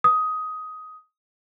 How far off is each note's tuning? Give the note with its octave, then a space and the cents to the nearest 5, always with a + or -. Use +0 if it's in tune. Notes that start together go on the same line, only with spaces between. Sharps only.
D#6 +10